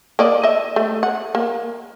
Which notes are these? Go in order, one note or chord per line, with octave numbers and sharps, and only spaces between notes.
A#3 D5 D#5
D#5 E5
A3
F#5
A#3